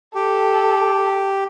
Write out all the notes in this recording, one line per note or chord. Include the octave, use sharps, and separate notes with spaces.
G4 A4